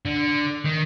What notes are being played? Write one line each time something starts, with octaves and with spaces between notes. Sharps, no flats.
D3
D#3